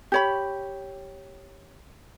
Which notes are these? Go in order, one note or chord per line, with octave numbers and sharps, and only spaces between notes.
G4 C#5 B5